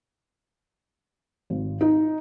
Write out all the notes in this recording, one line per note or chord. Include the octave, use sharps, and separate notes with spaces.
G#1
D#4